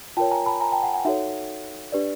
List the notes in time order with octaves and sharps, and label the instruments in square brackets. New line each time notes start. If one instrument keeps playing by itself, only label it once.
[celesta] F4 A#4 C#5 G5 A5
G#5 A#5
A5 B5
G#5 A#5
G5 A5
F#5 G#5
F#5 G#5
D#4 F#4 A4 C#5 E5 F#5
D4 G4 B4 D5